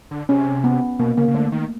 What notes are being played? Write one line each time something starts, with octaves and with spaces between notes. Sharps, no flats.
D3
C3 C#4
B3
B2 A#3
C#3 A#3
C#3
D3 A3
D#3